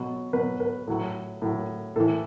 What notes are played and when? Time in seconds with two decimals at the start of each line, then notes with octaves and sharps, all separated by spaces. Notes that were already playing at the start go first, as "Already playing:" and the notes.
Already playing: B2 F#3
0.33 B2 F#3 B4
0.60 B4
0.88 A2 F#3
1.42 A2 F#3
1.96 A2 E3 A4